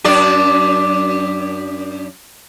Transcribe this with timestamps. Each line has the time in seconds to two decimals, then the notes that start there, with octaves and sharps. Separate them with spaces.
0.04 F#2 D4 D5